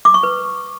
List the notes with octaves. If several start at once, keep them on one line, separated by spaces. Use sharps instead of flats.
D6
C#6
B4